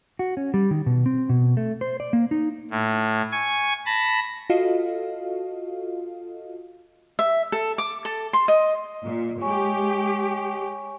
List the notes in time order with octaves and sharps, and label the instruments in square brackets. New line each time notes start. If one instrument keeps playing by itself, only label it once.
[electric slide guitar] F#4
C#4
G3
D#3
B2
C4
B2
A3
C5
D5
A#3
D#4
[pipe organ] A2
G#5 C#6
A5 B5 A#6
[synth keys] F4 F#4 A4 D#5 F5
[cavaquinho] E5
A4
D6
A4
C6
D#5
[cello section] A#2
[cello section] G#3 G4 [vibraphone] C#5 G#5 C#6